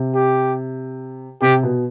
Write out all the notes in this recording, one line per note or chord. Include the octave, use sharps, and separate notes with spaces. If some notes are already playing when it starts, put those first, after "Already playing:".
Already playing: C3
G4
C3 G4
B2